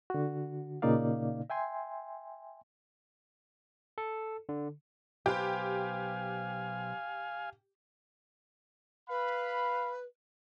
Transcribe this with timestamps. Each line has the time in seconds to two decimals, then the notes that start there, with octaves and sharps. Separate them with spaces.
0.10 D3 F#4
0.82 A#2 C#3 A#3 D#4 D5 F5
1.50 E5 G5 G#5 C6
3.98 A4
4.49 D3
5.26 B1 G4 B4 C5 F5 G#5
9.09 B4 F5 B5